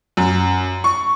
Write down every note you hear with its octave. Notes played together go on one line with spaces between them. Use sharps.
F#2
C#6